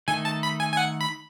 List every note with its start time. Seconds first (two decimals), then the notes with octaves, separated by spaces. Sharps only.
0.08 D#3 A3 D#4 A4 G#5
0.25 A5
0.43 B5
0.60 G#5
0.73 G#5
0.77 F#5
1.01 B5